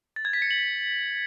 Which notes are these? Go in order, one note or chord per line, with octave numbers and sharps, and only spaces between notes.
A6
G#6
B6
C#7
F#7